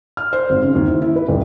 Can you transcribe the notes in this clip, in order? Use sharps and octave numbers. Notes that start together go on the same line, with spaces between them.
F6
C5
G#1
C#3
D#2
E4
E4
B4
D#1